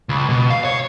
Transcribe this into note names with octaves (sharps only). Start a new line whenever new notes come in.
C#2
B2
F5
C#5